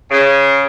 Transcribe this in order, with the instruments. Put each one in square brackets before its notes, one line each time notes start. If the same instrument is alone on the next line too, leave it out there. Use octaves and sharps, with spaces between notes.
[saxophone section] C#3